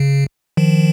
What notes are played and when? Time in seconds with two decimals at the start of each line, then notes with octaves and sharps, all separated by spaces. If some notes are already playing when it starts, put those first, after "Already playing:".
Already playing: C#3
0.57 D#3 F3